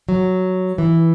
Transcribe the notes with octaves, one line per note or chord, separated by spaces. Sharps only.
F#3
E3